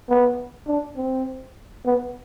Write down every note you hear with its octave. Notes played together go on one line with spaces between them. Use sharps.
B3
D4
C4
B3